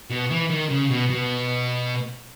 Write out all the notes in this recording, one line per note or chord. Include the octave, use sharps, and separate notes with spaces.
B2
E3
D#3
C#3
B2
B2